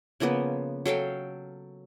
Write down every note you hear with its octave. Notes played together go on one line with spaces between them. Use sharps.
C#3 F3 A#3 B3
F#3 A4 F5 G5